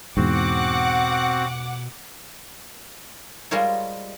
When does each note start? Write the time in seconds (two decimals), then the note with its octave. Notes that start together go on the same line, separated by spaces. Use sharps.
0.17 E2 G#2 B2 C4 F#4 F#5 D6
3.51 G3 G#3 F4 A#4 C5 C#5